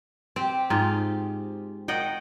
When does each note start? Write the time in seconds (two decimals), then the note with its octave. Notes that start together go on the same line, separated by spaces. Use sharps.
0.36 C4 G4
0.70 G#2 D#4 F4
1.88 D#3 D#5 F#5 G5